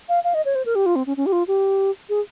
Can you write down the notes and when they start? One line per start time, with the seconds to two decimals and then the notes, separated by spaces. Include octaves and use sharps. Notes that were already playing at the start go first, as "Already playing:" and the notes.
0.09 F5
0.24 F5
0.34 D#5
0.45 C#5
0.55 C5
0.66 A#4
0.75 G4
0.86 F4
0.96 C4
1.07 C#4
1.17 C#4
1.26 G4
1.33 F4
1.48 G4
2.09 G#4